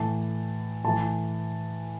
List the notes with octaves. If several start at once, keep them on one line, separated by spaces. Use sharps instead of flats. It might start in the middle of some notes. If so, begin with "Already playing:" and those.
Already playing: A2 E3 A5
A2 E3 A5